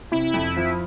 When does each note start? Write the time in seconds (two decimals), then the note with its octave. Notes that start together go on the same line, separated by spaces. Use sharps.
0.12 C3 E4
0.34 F2
0.56 F3